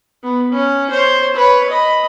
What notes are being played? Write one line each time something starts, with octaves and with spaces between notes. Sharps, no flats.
B3
C#4
C5 C#5
B4 C#5
D#5 B5